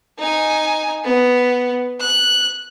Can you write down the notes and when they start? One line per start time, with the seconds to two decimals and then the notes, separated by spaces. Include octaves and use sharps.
0.19 D#4 G#5
1.04 B3
2.00 F#6